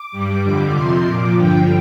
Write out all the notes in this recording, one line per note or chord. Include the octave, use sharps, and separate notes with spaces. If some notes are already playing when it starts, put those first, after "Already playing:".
Already playing: D6
G2 G3
F2 D3 G3
F2 C3 F3 C6
A#2 F3 D6
G2 D3 F3 G5